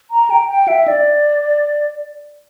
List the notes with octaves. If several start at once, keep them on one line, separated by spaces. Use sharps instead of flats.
A#5
G5
G5
E5
D5